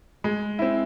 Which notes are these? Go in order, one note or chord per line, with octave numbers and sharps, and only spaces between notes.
G#3
C4 E4